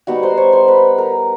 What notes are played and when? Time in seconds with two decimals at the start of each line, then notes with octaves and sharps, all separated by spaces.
0.07 G3 B3 D#4 F#4 F#5
0.23 C5 C6
0.37 C#5 C#6
0.53 C5 C6
0.68 B4 B5
0.98 A#4 A#5